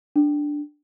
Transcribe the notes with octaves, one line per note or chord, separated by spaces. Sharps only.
D4